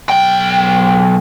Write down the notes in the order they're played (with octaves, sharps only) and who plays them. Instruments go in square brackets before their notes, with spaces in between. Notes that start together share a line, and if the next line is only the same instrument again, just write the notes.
[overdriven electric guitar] B1 G5